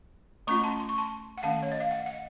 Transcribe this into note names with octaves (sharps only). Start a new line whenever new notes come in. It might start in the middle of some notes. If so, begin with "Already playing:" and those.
A3 C#4 F4 A#5 C#6
A5 C6
C6
C#6
A5 C6
F#5
D#3 A3 C#4 F5 A5
C#5
D#5
F5
D#5 F#5
D#5 F#5